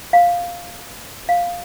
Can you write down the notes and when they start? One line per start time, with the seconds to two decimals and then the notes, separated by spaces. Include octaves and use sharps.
0.13 F5
1.29 F5